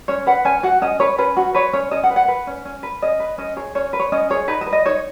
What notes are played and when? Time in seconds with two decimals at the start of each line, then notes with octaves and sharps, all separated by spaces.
0.08 C#4 C#5
0.27 B4 F#5
0.45 C#4 G#5
0.63 F#4 F#5
0.82 C#4 D#5
1.00 B4 C#5
1.18 C#4 B4
1.37 F#4
1.54 B4 C#5
1.73 C#4 C#5
1.91 C#4 D#5
2.03 F#5
2.10 B4
2.16 F#5
2.28 B4
2.47 C#4
2.65 C#4
2.83 B4
3.02 C#4 D#5
3.20 B4
3.38 C#4 D#5
3.57 G#4 C#5
3.75 C#4 C#5
3.93 B4
4.00 C#5
4.12 C#4 D#5
4.30 G#4 C#5
4.48 D#4 B4
4.61 D#5
4.66 B4
4.73 D#5
4.86 D#4 C#5